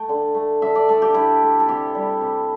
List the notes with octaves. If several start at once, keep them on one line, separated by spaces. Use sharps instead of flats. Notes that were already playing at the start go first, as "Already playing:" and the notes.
Already playing: A3 G5
D3
A3
D3 E5
D5
A3 A4
G4
D3 E4
A3
A4
C3 G4
G3
C3